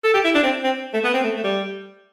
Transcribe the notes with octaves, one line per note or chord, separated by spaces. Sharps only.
A4
G4
E4
D4
C4
C4
A3
B3
C4
A3
A3
G3